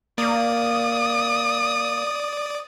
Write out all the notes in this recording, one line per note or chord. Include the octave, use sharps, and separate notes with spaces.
A#3 D5 D#6